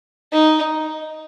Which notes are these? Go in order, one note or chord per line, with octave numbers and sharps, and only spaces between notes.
D#4